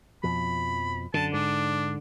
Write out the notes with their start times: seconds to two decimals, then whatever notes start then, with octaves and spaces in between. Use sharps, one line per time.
0.23 F2 B2 F3 B5
1.14 F#2 D3 A5
1.33 G#2 D4